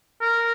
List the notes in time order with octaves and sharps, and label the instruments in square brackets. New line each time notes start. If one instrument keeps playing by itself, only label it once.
[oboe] A#4